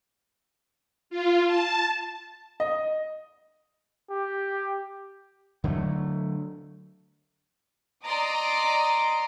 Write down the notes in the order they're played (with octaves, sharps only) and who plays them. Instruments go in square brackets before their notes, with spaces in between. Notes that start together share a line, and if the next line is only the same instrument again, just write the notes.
[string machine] F4
A5
[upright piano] D#5
[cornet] G4
[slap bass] D3 F#3 G#3 A3
[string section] D5 D#5 A#5 C6 D6 D#6